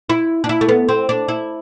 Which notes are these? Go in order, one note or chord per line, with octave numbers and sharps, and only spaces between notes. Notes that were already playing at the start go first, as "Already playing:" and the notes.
E4
D4
E4
A3
B3
C4
D4
E4